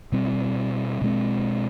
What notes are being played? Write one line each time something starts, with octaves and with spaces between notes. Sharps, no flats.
B2 G3 C4
B2 G#3 C4